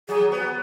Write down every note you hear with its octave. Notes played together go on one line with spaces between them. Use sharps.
F#3 G#4
B3